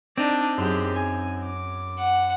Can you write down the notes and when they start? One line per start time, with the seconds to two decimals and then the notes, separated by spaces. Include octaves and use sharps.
0.18 C4 D4 D#4 D5
0.57 F#2 G4 G#4 C6 E6
0.95 G#5
1.45 D6
1.98 F#5